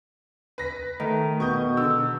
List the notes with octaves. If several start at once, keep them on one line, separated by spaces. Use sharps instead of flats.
B4 A#6 B6
D#3 A3
B2 C#6 D#6 G6
D3 E6